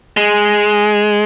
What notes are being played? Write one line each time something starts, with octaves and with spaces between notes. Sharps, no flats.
G#3